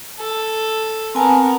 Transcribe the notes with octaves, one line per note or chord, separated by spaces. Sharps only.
A4
B3 C4 A#4 G#5 A5